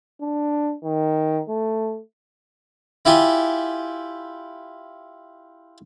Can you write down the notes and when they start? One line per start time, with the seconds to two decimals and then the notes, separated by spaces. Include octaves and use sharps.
0.21 D4
0.84 D#3
1.49 A3
3.05 E4 F4 G4 G#5